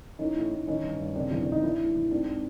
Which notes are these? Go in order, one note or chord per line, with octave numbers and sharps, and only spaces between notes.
E3 C#4 D#4
A2
A2
D#3 C#4 D#4
G2
G2
C#3 C4 D4
E2
D4
E2
D#4
E3 D4 E4
A2
E3
G#2 C4 D4
C4